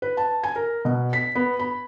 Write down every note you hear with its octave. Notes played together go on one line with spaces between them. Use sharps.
B4
A5
G#5
A#4
B2
B6
B3
B5